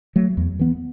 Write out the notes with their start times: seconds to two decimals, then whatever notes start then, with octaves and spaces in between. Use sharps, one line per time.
0.16 F#3 A3
0.37 E2
0.59 E3 B3